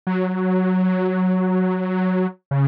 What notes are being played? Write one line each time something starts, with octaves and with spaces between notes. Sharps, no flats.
F#3
C#3